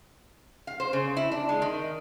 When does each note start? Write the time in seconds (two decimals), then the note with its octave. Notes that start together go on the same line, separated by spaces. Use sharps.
0.67 F5
0.80 C5
0.93 C#3
1.17 E4
1.32 D4
1.49 G#3
1.62 D#3